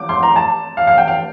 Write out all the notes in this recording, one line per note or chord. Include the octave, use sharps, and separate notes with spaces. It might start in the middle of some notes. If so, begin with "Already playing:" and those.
Already playing: D6
C6
A#5
A5
F5
F5
G5
F5